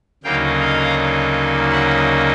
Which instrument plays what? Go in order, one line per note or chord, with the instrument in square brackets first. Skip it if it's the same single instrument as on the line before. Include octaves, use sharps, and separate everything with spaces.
[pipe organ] D2 C#3 F#3 A#3 D#4 F5 G5
D#5 F5
E5 F#5